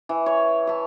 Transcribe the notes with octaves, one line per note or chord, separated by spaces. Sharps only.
E3
C#5
E5 A5